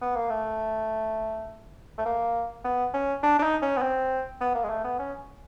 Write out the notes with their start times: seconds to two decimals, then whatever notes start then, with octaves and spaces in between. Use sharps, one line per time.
0.01 B3
0.16 A#3
0.30 A3
1.98 A3
2.06 A#3
2.64 B3
2.94 C#4
3.23 D4
3.39 D4
3.43 D#4
3.62 C#4
3.77 B3
3.82 C4
4.41 B3
4.55 A#3
4.64 G#3
4.70 A3
4.85 B3
4.99 C#4